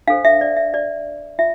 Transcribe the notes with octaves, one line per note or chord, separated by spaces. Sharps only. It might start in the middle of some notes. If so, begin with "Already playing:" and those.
D4 A4 C5 F5
E5
D5
E5
D5
F4 E5